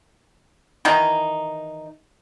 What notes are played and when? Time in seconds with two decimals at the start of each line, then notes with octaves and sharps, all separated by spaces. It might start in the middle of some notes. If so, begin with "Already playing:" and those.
0.85 D#3 E3 D#4